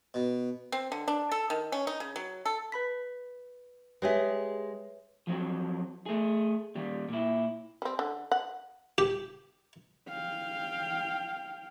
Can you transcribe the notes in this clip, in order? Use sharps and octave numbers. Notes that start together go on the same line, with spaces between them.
B2
C4
D3
D4
A4
D#3
C#4
D#4
C#3
F#3
A4
B4 B5 B6
G#3 G4 G#4 B4 C#5 E5
F3 F#3 C4
A3 G#4
D#2 G3
A#2 E4
G3 C4
D3
F#5
G4
F5 G5